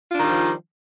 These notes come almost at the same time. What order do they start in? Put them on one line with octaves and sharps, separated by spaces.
F4 D4 D#3 G3 F3